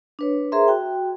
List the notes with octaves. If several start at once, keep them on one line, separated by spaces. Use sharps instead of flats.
D4 B4 C#5
G#4 A#4 C5 E5 A#5 C6
F#4 G5